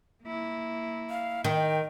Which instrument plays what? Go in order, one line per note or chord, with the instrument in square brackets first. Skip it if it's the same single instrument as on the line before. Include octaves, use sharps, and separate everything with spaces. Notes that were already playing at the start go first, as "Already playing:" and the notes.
[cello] A#3 E4
[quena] F5
[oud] D#3 [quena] G5